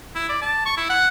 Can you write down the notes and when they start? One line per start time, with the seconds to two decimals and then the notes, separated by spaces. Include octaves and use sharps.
0.15 E4
0.29 D5
0.42 A5
0.65 C#6
0.77 E4
0.90 F#5